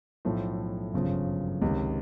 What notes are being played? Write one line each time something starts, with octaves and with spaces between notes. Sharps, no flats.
B1 A2 F3 A3
G1 F#2 C#3 F3
C#2 C3 D#3